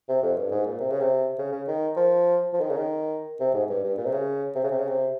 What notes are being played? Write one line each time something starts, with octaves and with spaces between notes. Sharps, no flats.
C3
F2
G2
G#2
A#2
C3
C#3
C3
C#3
C#3
D#3
F3
F3
D#3
C#3
D#3
C3
G#2
G2
G2
A#2
C3
C#3
C3
C#3
C3
C#3
C3